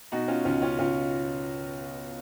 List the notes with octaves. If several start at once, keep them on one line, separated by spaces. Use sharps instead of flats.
B2 D#4 F#4
C#4 F4
C#2 C#4 F4
C#4 F4
C#2 C#4 F4